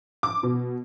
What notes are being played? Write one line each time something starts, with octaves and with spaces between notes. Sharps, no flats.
D6
B2